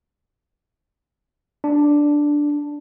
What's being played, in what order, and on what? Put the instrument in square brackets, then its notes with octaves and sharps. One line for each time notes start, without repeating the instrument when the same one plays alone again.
[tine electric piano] D4